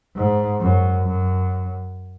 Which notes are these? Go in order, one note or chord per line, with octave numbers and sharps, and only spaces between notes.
G#2
F#2
F#2